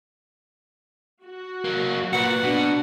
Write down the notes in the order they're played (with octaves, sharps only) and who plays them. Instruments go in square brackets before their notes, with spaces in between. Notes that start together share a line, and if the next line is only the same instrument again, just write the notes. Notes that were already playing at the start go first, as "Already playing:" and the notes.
[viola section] F#4
[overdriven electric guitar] F#3 A#3
[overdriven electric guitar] A#2 [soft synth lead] B4 [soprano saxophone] F#5
[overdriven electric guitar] B2 [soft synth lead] D4